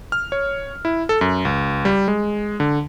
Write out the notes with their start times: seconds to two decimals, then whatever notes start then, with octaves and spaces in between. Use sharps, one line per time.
0.12 F6
0.32 C#5
0.85 E4
1.09 A4
1.21 F#2
1.45 C#2
1.85 G3
2.08 G#3
2.60 D3